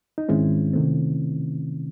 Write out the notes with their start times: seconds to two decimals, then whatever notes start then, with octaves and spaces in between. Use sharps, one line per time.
0.18 D#4
0.29 G#2 D#3 G#3 C4 C#4 E4
0.73 C3 D#3 A3 C4